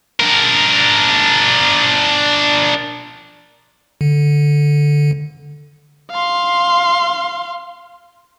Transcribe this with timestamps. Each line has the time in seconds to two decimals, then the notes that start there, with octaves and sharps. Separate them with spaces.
0.20 D4 A#4
4.01 D3
6.11 F5 C6